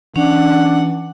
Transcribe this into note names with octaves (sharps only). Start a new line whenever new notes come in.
E3 C#4 D4 F#5